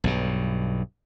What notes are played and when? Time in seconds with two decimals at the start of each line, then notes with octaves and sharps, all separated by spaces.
0.04 B1 G2 B2